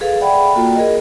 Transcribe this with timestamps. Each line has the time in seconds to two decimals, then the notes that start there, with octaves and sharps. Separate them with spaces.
0.01 G#4 A4 B4 F5
0.20 D5 E5 F#5 G5 B5
0.55 A#3 F4 F#4 A4 G5
0.75 G#4 A#4 D#5